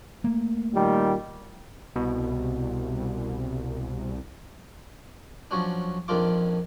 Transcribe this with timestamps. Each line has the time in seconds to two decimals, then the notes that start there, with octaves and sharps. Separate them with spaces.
0.24 A3 A#3
0.73 A#2 D#3 G3
1.96 C2 B2
5.51 F3 F#3 C#4 D4
6.08 A#1 F2 D#3 D4 F4 D6